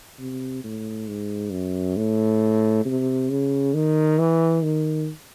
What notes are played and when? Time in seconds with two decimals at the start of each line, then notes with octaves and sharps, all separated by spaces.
0.19 C3
0.64 A2
1.08 G#2
1.52 F#2
1.97 A2
2.85 C3
3.30 C#3
3.74 D#3
4.18 E3
4.63 D#3